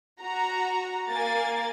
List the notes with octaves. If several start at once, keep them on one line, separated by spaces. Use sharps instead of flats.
F#4 A#5
A#3 G#5 A6